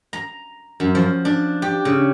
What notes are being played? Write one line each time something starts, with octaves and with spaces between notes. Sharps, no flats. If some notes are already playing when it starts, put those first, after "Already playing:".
A#5
F#2
F3
D4
G4
C#3